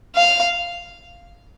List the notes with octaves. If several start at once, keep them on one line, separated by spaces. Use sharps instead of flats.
F5